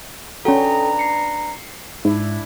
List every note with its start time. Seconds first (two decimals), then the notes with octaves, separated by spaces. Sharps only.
0.45 C#4 D4 F#4 A4 B4 G5 A#5
0.99 C7 C#7
2.05 G#2 D4 E4